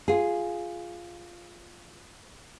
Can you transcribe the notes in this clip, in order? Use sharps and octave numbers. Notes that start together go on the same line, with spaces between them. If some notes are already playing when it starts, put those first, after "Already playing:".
F4 G#4